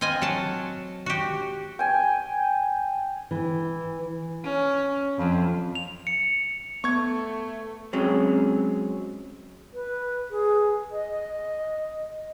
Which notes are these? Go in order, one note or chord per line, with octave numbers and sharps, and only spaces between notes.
C4 F4 D#5 G#5
F#3 F#5 A5
F#4 G4
G5 G#5
E3
C#4
F2
F7
C#7
A3 B3 C#6 G#6
F#3 G#3 C4 C#4
B4
G#4
D#5